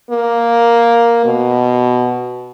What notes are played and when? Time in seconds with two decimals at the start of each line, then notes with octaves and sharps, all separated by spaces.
0.11 A#3
1.25 B2